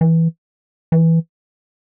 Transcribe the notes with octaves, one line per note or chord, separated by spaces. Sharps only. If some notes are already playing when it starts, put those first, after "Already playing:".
E3
E3